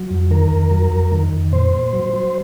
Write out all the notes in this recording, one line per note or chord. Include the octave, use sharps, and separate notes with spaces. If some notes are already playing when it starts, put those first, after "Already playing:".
Already playing: F#3
F2
D#3 A#4
F2
F#3
F2
D#3
F2
A#2 C5
A#2
F#3
F#3